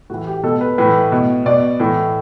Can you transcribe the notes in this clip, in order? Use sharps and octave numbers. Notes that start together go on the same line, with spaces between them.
A2 E3 F#4
G4
B2 A4
B4
A2 E3 B4
B2
B2 D5
A2 E3